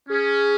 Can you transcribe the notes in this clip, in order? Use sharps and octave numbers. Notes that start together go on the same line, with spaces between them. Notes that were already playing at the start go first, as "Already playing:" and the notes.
C#4 G#4